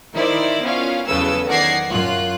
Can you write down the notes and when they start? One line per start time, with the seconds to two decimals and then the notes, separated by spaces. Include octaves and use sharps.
0.14 D#3 E4 A#4 C5 D5
0.62 B3 C#4 F4 F5
1.06 E2 C#3 F#3 A4 B4 E6
1.47 D#3 D5 F#5 G#6 A#6 C7
1.88 F#2 F4 F#6